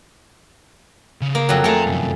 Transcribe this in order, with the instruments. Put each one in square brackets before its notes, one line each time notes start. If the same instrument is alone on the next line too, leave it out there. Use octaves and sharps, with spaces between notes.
[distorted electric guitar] C#3
[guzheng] A#3
F2 F#3
[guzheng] A3 G#4 [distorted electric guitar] G5 A#5
[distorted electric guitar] C2 F#2